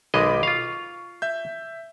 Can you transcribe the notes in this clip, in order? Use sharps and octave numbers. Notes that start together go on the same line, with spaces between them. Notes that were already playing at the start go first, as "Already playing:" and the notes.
B1 D#3 G#3 D#5 B5 D6
F4 F5 C#6
E5 G6